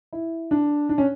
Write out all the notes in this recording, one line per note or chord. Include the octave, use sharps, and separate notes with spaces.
E4
D4
D4
C#4